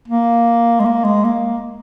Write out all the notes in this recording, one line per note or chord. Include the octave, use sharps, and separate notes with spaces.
A#3
G#3
A#3
G#3
A#3